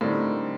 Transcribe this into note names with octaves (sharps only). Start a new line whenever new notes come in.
A2 D3 G3 C4 D#4 A#4